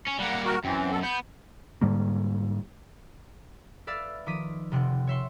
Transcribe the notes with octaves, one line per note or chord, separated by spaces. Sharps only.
C#4
G3 A#3 F#5
F#4 A#4
F#2 E3 C4
B2 A4
B3 G6
G#2 D3 G3 A#3
B4 D5 E5 F5 E6 A6
D#3 F3 D6 D#6 B6 D#7
F1 C3 C4 F#5
C#5 E5 C6 C#6